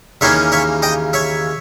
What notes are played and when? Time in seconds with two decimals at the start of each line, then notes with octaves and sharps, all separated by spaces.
0.21 D#2 C#3 E3 A#3 C#4 C#5 E5
0.52 C#5 E5
0.82 D#5 G5
1.13 C#5 E5